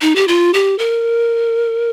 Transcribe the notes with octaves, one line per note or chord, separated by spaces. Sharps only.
D#4
G4
F4
G4
A#4